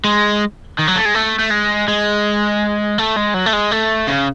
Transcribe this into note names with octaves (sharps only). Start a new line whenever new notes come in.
G#3
D#3
F#3
A3
G#3
A3
A3
G#3
G#3
A3
G#3
F#3
A3
G#3
A3
C#3